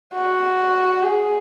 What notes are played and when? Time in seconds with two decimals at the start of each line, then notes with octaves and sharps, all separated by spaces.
0.14 F#4
1.03 G#4